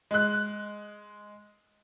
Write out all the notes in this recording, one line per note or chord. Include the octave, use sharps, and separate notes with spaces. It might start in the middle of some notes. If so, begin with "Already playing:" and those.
G#3 F#6